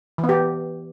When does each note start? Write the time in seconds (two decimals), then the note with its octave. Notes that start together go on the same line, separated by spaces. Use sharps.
0.18 E3
0.24 B3
0.29 G4